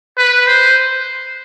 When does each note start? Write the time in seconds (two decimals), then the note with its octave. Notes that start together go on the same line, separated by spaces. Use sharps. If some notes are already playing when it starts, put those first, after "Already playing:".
0.18 B4
0.48 C5